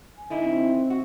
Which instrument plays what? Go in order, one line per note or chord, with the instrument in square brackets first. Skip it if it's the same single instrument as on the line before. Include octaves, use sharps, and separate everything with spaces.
[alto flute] G#5
[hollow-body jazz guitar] D3 D#4 E4
[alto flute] C4
[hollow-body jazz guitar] F#4